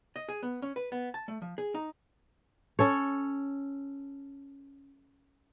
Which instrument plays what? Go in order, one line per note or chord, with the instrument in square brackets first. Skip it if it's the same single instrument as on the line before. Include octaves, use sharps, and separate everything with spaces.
[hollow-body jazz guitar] D#5
G#4
B3
C#4
B4
B3
A5
A3
F3
G#4
D#4
[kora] C#4 A4 C#5